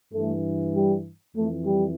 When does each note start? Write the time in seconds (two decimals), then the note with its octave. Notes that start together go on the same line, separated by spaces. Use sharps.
0.13 G2 E3 A3
0.74 G3
1.34 F2 E3 A3
1.65 G3